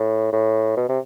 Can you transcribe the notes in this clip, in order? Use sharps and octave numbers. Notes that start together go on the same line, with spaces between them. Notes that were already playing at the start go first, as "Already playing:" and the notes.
Already playing: A2
A2
B2
C3